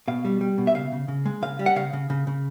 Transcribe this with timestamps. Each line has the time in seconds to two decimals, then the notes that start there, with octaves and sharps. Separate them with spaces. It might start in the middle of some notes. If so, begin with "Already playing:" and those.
0.08 B2 F5
0.25 G3
0.41 G3
0.58 B2
0.67 E5
0.75 C#3 F5
0.92 C#3
1.08 C#3
1.26 G#3
1.42 C#3 F5
1.59 G3
1.66 F#5
1.76 C#3 F5
1.93 C#3
2.10 C#3
2.27 C#3